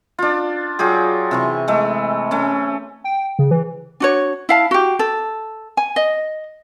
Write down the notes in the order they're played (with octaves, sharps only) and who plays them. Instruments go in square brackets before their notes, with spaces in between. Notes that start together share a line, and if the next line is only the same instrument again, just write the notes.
[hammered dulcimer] D4 F4
F#3 F4 G4 G#4
C3 E3 C#6
G#3 A3 E5
A3 C#4
[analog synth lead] G5
C#3
E3
[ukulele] D4 F#4 C#5
E4 F5 A5
F#4 G4
A4
G#5
D#5